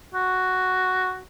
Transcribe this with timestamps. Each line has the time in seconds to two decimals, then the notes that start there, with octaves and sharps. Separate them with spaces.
0.14 F#4